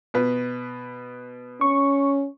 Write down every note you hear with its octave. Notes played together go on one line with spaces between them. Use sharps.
B2 B4
C#4 C#6